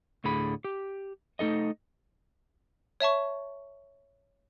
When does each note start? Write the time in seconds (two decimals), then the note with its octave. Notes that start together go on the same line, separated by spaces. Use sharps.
0.24 D2 A2 D3 G#4 B5
0.64 G4
1.39 A3 D#4 A4 D#5
3.00 C#5 E5 A5 C#6